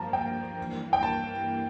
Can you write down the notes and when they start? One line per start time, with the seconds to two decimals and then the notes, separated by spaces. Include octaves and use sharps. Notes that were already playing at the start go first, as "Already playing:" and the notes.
Already playing: G2 F3 A#3 A5 A#5
0.13 G5
0.58 G2 E3 A#3
0.93 G5
1.03 A5